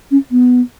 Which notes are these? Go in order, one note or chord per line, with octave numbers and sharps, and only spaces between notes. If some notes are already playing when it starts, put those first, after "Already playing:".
C#4
B3